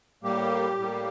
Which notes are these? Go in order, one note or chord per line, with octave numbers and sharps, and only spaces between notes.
A2 G3 A#3 G4
A2 G3 A#3